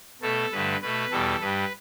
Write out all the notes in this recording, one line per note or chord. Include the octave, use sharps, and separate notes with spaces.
B2 A3 A4
G2 D3 A3 B4
B2 A3 B4
E2 B2 G3 A4
G2 G3 B4